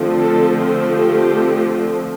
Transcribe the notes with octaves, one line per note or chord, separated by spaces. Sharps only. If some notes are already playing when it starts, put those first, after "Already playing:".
Already playing: D3 F3 A3 C4
A4
G4